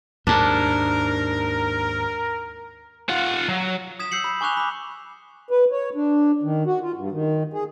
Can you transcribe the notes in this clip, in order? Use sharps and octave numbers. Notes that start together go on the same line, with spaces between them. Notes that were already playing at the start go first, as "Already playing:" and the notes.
D#2 G#2 D4 A#4
F4 F#5
F#3
D#6 G#6 B6 E7
E6 G6 C7 C#7 F#7
B5
G#5 C#6 D6 F#6 F7
B5 D6
B4
C#5
D4
D#3
F#4
F4
G2
D#3
G#4